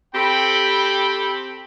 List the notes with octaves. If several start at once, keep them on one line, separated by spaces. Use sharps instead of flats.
C4 G4 A4 G5 B5